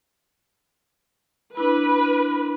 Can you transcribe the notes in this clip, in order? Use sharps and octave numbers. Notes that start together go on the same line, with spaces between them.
D4 E4 B4